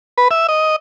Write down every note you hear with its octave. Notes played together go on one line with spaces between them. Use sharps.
B4
E5
D#5